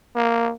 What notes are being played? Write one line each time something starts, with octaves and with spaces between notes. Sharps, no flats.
A#3